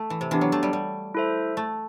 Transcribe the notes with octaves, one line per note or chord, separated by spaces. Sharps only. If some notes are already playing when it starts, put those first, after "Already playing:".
Already playing: A3
E3
C3
E3 B3 D4 G4
F#3
A3
G3
G3
E4 A4 C5 E5
A3